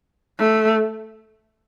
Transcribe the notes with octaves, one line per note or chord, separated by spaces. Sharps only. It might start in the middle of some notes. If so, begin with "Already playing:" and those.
A3